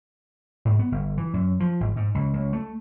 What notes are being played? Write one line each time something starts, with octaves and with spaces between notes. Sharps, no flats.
G#2
B3
G1
E3
F#2
F3
G#1
G#2
C#2
C#2
A3